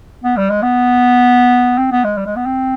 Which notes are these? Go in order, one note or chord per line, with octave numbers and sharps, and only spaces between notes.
B3
G3
G#3
B3
C4
B3
G#3
G3
G#3
B3
C4